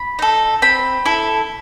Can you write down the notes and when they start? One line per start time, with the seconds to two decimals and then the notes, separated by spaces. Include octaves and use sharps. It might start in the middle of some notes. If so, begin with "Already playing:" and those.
Already playing: B5
0.19 D#4 A4
0.62 C4 B5
1.05 E4 A4